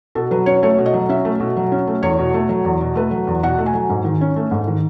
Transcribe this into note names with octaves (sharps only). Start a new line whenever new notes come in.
B2 A4
F#3 B4
C#4 C#5
A3 C#5
B2
D#5
F#3
C#4 E5
A3
B2
F#3
C#4
A3
E2 C#5
B2
A3
F#3
E2
B2
A3 B4
F#3
E2
B2 F#5
A3
G#5
F#3
G#2
D#3
C#4
A3
G#2
D#3